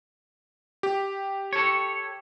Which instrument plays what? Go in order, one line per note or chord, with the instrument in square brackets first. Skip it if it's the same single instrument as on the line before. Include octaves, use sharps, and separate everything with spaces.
[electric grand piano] G4
[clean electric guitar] A4 C#5